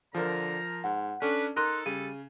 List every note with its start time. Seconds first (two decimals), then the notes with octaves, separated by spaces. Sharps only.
0.15 D3 F3 A#4 A#5
0.84 G#2 F#5
1.22 C#4 D4 A4 B4
1.56 D#4 A4 A#4 C6 F#6 A#6
1.86 C#3 G3 D#7